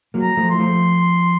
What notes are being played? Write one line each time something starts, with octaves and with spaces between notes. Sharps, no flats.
F#3 A#3
A#5
F3 A3
C6
F3 A3